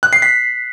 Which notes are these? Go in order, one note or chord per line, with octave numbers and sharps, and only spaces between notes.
F#6
C7
B6